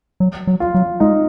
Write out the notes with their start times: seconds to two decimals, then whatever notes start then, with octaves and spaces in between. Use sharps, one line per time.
0.20 F#3
0.47 F#3
0.60 F4
0.75 F#3
1.00 G#3 D#4